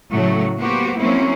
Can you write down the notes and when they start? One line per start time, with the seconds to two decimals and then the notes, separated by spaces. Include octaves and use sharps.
0.11 A2 C#3 F#3 A3
0.57 A#3 B3 F#4 G4 C5
0.97 F#3 A#3 C4 C#4 E4